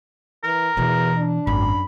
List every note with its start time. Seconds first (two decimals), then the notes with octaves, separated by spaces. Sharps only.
0.44 E3 A#4
0.77 E2 B2 E3
1.17 D4
1.47 G#1 F#2 B5